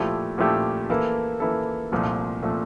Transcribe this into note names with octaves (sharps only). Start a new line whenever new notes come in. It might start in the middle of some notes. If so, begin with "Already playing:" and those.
Already playing: A#2 F3 A3 E4 G4
A#2 F3 A3 E4 G4
E3 A#3 E4 A4
E3 A#3 E4 A4
C2 A#2 F3 A3
A#2 F3 A3